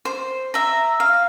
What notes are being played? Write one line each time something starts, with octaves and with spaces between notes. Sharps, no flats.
C5
E5 A#5
F5